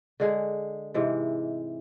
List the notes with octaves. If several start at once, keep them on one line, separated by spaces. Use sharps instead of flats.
D3 G#3 G#4
G#2 C3 E3 G#3